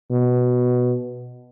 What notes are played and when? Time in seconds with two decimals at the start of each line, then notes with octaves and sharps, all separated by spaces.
0.11 B2